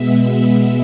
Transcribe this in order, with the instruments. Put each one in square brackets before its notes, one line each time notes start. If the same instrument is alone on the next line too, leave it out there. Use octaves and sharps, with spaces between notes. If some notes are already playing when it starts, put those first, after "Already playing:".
Already playing: [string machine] B2 G#3 B3 E5